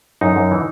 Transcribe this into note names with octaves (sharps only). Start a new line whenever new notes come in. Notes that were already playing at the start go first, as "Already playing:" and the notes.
F#2 D#4
F#2
E3